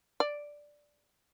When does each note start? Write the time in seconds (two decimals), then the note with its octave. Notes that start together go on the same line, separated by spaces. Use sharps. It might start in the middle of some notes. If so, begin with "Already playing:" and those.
0.20 D5